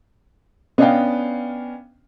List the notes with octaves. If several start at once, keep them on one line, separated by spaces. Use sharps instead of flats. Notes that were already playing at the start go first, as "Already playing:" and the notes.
B3 C#4 D4 D#5 F5 G5